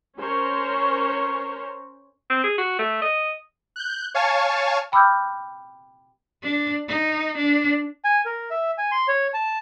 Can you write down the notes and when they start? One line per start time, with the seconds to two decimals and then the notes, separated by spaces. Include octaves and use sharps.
0.18 C#4 A#4 C5 C#5
2.30 C4
2.44 G#4
2.58 F#4
2.79 A3
3.02 D#5
3.76 F#6 G6
4.14 C#5 F5 G#5 A5 C#6
4.92 G5 B5 D6 E6 F6 G6
6.43 D4
6.88 D#4
7.37 D4
8.05 G#5
8.25 A#4
8.50 E5
8.78 G#5
8.92 C6
9.08 C#5
9.34 A5